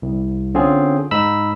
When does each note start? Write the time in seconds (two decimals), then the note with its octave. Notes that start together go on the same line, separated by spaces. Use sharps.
0.02 C2
0.54 D3 C4 C#4 F4 G#4
1.11 G#2 D#4 B5 E6